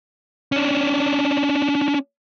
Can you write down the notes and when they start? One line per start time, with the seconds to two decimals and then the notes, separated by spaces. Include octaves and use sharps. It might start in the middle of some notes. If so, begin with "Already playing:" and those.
0.52 C#4 D4